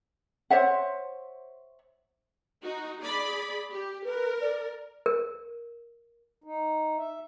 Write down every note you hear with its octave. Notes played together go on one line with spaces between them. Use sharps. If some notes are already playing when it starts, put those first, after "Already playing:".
C5 C#5 E5 F#5
D#4 F#4
G#4 D5 B5
G4
A#4 B4
D5
A#4
D#4
E5